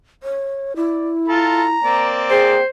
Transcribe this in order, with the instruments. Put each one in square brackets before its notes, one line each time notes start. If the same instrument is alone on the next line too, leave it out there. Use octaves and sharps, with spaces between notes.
[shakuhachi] C#5
[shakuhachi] E4 [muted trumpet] D5
[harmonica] F4 A4 [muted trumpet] A#5
[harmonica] A#3 C4 D5
[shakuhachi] G#4 [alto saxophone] C5 [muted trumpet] G5